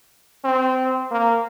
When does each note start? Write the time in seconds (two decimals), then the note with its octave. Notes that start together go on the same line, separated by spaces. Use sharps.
0.44 C4
1.11 A#3